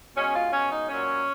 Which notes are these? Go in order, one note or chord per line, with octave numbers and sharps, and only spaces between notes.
B2 G#3 C#4
F4
B2 G#3 C#4
D#4
A#2 F#3 C#4